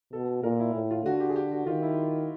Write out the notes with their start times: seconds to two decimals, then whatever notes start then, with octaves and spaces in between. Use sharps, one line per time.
0.13 B2 A4
0.43 A#2 A#4
0.60 E4
0.74 A2
0.91 F4
1.05 D3 F#4
1.20 G4
1.30 G#4
1.36 G4
1.51 F#4
1.66 D#3 F4
1.82 E4